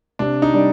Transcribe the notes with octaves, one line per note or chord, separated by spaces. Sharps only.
C3 D4
D#4
G3 D4 G4 D5